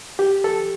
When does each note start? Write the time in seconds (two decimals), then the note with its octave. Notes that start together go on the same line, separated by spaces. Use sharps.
0.19 G4
0.44 A4